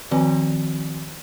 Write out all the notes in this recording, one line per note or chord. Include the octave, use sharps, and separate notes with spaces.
D#3 F3 C4 F#4 D5